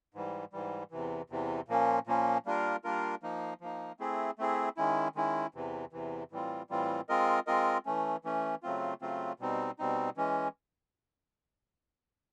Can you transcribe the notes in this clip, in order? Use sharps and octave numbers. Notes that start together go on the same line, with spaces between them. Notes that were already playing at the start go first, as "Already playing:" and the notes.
G#2 E3 G3
G#2 E3 G3
E2 C3 E3
E2 C3 E3
A#2 F3 A#3 C#4
A#2 F3 A#3 C#4
G3 A#3 D4 F4 A#4
G3 A#3 D4 F4 A#4
F3 A#3 D#4
F3 A#3 D#4
A3 C4 E4 G#4
A3 C4 E4 G#4
D#3 G#3 C#4 E4
D#3 G#3 C#4 E4
E2 C3 E3
E2 C3 E3
A2 E3 G3 C4 F4
A2 E3 G3 C4 F4
G#3 C4 F4 A#4 D#5
G#3 C4 F4 A#4 D#5
E3 A3 C#4
E3 A3 C#4
C#3 F#3 A3 C4 F4
C#3 F#3 A3 C4 F4
B2 G3 C4 D#4
B2 G3 C4 D#4
E3 G#3 C#4